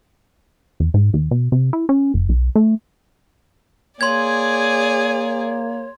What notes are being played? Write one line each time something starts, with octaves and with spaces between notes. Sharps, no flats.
E2
G#2
D#2
B2
C3
E4
C#4
F#1
B1
A3
A#3 G#4 C#5 D5 C6 G#6